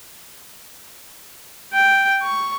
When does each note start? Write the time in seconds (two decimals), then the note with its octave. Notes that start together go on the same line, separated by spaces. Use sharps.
1.73 G5
2.22 C#6